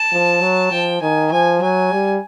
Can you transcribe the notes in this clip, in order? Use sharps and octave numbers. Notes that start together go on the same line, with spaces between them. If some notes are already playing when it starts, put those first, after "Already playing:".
Already playing: A5
F3
F#3
F3 G5
D#3 G#5
F3 G#5
F#3 G#5
G3